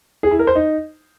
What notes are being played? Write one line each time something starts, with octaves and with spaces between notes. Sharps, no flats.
G#4
E4
A#4
C5
D#4